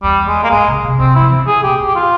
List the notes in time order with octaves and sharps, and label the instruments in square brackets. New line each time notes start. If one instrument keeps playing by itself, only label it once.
[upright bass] E2 [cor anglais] G3
[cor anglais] G#3
A#3
[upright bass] G#2 [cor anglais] G#3
[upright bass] C#3
C3
[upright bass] C3 [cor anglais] C4
[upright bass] F3 [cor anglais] E4
[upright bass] E3
C#3
[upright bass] C3 [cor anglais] G#4
[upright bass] A#2 [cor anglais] G4
[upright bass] F2
[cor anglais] G4
F4